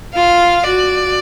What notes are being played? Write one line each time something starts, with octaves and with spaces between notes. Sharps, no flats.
F4 F5
F#4 D5